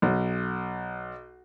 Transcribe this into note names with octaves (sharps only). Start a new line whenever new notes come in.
B1